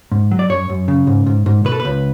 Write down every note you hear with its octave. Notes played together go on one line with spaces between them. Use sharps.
G#2
F#3
D5
F#2 C#5
F#2
C#3
G#2
G#2
G#2
B2 B4
A4
B4
C#2